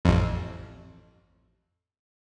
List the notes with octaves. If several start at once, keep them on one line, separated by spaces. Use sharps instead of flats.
A1 F2